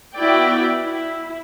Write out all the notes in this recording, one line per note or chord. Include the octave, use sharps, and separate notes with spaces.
B3 E4 F#4 D5 G5
E4